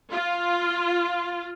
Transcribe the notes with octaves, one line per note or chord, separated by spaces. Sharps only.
F4